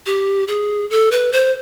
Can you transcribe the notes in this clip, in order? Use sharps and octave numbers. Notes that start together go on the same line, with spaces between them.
G4
G#4
A4
B4
C5